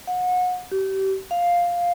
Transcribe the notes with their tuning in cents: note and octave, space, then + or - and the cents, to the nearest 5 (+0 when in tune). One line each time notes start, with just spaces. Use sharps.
F#5 -30
G4 -30
F5 +5